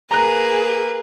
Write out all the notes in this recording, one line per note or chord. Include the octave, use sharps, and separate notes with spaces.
A#3 G#4 B4 A#5 F#6